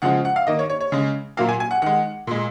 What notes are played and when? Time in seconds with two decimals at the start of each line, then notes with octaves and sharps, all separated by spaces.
0.02 C#3 F3 G#3 F#5
0.25 F#5
0.36 F5
0.47 D#3 A#3 D#5
0.59 C#5
0.70 C#5
0.80 C#5
0.92 C#3 G#3
1.37 A#2 F#3 A#3 F5
1.49 G#5
1.60 G#5
1.71 F#5
1.82 D#3 G#3 F#5
2.27 A#2 G#3